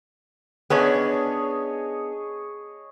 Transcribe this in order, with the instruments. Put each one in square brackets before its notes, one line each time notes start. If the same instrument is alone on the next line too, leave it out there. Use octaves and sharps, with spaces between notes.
[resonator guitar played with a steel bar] B3 C#4 D4 [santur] G#4 C#5 D#5